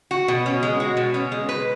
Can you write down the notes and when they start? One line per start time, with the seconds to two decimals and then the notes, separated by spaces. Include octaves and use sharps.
0.11 F#4
0.28 B2
0.46 C#4
0.63 G#3
0.80 F#4
0.97 B2
1.14 C#4
1.32 G#3
1.49 B4